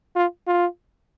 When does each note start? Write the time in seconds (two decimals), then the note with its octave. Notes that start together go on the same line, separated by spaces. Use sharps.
0.16 F4
0.47 F4